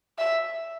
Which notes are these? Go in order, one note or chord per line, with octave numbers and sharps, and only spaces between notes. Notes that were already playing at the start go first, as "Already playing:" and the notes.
E5